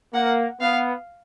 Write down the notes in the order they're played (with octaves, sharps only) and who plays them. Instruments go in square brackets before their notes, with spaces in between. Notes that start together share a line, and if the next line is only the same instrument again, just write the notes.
[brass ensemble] A#3 [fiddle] F#5
[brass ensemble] B3 [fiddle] F5